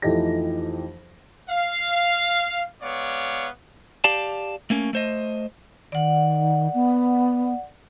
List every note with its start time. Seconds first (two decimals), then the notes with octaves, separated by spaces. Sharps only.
0.02 F2 E3 A3 D#4 G4 A#6
1.50 F5
2.82 G#3 B3 C#5 D5 F5
4.04 G4 D5 F5 A5
4.70 A3 A#3 C#4
4.93 A3 C5 D#5
5.92 D#3 D5 F#5
6.74 B3